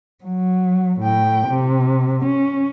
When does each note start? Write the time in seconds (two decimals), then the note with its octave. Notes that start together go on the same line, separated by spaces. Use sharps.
0.24 F#3
1.01 A2 G5
1.48 C3
2.25 C#4